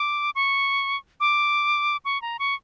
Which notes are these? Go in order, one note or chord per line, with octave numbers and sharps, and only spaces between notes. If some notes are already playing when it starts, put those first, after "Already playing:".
Already playing: D6
C#6
D6
C#6
A#5
C#6